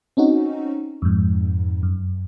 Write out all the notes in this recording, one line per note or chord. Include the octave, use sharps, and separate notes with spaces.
C4 C#4 D#4 F#4
F2 G#2
F#2